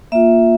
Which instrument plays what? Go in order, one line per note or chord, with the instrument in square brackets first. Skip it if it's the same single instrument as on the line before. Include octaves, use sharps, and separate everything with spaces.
[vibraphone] A#3 F4 E5